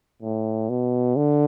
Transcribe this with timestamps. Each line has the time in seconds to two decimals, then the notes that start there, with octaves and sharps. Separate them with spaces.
0.22 A2
0.69 B2
1.16 D3